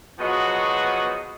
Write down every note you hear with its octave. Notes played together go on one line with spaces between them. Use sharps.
F3 F#3 G#3 B3 F#4